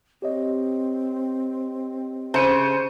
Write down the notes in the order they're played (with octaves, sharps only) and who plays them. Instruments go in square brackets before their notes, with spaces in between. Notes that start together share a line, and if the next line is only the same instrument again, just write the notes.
[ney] C4 [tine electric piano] G4 C#5 D#5
[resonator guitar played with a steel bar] C#3 [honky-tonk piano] C5 C#7 D#7